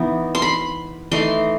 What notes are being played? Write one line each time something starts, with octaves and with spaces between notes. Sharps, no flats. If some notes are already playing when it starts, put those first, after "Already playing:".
Already playing: E3 B3 D#4
C6
B5
E3 A3 D#4 C6